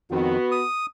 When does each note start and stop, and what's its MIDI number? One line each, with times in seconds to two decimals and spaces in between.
0.11 0.37 41
0.11 0.37 51
0.11 0.61 59
0.11 0.61 66
0.51 0.86 87